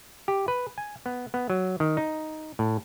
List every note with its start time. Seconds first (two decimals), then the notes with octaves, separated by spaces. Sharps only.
0.28 G4
0.48 B4
0.78 G#5
1.06 B3
1.34 B3
1.50 F#3
1.80 D#3
1.97 D#4
2.59 A2